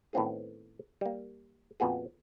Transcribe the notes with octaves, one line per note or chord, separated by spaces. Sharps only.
A2 D#3 B3 C4 F4 G#4
G3 A#3
F2 A#2 B3 F#4 G#4